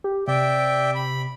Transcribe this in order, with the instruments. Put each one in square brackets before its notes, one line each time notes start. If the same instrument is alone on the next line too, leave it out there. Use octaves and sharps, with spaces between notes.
[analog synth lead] G4
[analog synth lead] C3 [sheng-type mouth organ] D5 E5 G5
[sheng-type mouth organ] B5